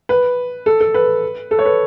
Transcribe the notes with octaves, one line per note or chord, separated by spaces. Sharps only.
B4
A4
A4
B4
A4
C#5
B4